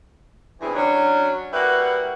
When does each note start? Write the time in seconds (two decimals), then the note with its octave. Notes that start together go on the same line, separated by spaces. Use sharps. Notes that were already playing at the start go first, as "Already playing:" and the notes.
0.61 G2 B2 E3 C4 E4 G#4
0.74 F#3 C#4 D4
1.53 G3 A#3 E4 F#4 B4 F#5